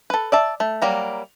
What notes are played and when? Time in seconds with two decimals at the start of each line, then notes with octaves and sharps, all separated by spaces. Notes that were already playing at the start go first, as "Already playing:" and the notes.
0.10 A4 B4
0.32 D5 E5 A5
0.60 A3
0.82 F#3 G3 A#3 A#5